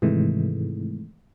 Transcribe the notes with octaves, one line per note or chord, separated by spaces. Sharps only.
G#2 C3 D#3 E3 G#3 A3